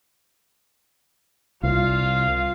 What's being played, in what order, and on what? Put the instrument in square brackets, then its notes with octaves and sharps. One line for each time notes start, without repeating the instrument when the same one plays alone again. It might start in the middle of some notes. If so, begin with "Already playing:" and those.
[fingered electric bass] C2 [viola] F4 [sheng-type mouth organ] F5